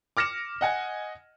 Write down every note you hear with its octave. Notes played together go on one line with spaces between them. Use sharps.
D6 F6 A#6 C#7 E7
D#5 F#5 G#5